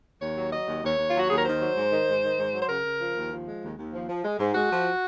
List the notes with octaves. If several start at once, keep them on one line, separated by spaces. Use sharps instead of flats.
D#2 C#5
F#3
F#3 D#5
D#2
D#2 C#5
D#2
F4
F#3 F#4
D#2 G#4
A#4
D#3 C5
F#3
G#2
D#3
G#2
D#3
G#2
F#3
C5
C#3 A#4
C#3
F3
D#2
F3
G#3
D#2
D#2
F3
F3
G#3
G#2
G#3 F#4
F3